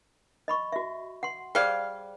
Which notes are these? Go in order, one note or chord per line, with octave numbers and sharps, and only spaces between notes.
D#5 B5 C#6
F#4 E5
F#5 C6
G3 G#4 C5 D5 F5